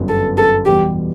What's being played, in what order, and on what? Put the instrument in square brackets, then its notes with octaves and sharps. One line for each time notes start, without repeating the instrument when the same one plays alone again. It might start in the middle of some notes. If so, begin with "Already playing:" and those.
Already playing: [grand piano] G1 F#2 E3 G3 B3
[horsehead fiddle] A4
A4
[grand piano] E2 B2 G3 [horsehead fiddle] G4